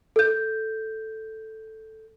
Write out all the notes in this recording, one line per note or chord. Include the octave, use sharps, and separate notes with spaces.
A4 G6